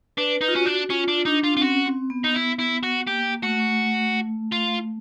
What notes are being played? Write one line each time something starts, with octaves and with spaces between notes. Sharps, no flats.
D4 B4
D#4
F4
C#4 F#4
D4
C#4 F4
D4
D4 D#4
F4
C4 F4
C#4 F#4
C4
B3
D#4
E4
E4
F#4
A#3 G4
A3 F#4
F4